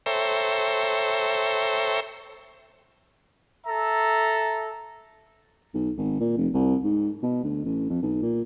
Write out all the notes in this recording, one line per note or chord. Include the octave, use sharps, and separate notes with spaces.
A4 C5 C#5 E5 G5 A#5
A4 E5 A#5
B1
G#1
A#2
F1
C2
G#2
B2
D2
A1
F2
B1
A#2